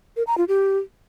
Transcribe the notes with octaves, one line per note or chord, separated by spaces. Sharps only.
A#4
A#5
F4
G4